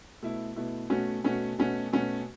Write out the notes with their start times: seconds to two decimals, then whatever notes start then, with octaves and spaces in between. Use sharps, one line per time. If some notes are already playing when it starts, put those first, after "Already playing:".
0.22 B2 A3 E4
0.56 B2 A3 E4
0.90 B2 A3 C#4 F#4
1.24 B2 A3 C#4 F#4
1.58 B2 A3 C#4 F#4
1.92 B2 A3 C#4 F#4